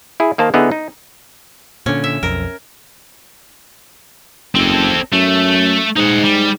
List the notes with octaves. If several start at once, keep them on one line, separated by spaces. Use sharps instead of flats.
E4 G#4
D#3 A#3 C5 A5
D3 B3 D#4 E4 G#4
D#4
A#2 D3 C#4
E5
B1 F2 A#4
F#1 C4 A4
F#2 A3
G#2 D#4 F#5
G3